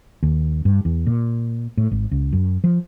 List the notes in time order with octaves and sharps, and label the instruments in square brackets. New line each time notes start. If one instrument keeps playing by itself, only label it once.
[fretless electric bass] D#2
G2
E2
A#2
A2
G#1
C#2
F#2
F3